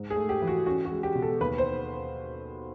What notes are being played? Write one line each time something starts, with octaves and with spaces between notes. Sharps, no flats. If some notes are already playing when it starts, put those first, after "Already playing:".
Already playing: G#2
G#4
A3
G4
E3
F#4
C#4 F#4
F#4
G#3
G4
B2
A4
D#2 B4
C5